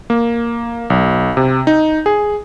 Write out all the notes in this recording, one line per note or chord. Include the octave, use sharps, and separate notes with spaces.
A#3
B1
C3
D#4
G#4